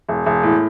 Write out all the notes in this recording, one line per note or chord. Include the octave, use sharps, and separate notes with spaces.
E1
E1
A2